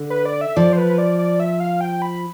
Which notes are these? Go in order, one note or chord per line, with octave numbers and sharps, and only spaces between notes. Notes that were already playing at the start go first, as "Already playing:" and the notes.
Already playing: D3
B4
D5
E5
F3 D5
C5
B4
D5
D5
E5
F5
G5
B5